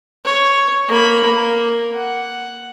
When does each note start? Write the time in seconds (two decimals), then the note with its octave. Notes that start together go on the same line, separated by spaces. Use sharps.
0.25 C#5
0.88 A#3 B5
1.24 A#3
1.95 F#5